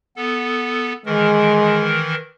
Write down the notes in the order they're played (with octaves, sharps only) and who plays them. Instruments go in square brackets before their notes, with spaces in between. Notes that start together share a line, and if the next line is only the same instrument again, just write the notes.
[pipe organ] B3 A4
[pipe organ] D#3 E3 A#4 [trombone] G#3